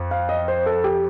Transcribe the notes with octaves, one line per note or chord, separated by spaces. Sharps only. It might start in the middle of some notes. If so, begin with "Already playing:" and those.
Already playing: F2
F5
D#5
C5
A4
G4